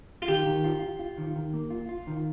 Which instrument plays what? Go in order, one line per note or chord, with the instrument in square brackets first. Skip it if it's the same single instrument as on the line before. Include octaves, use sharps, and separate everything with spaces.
[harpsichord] F4
[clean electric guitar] D#3 [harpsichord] G4
[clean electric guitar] D#3
F4
F4
F4
D#3
D#3
A#3
F4
F4
D#3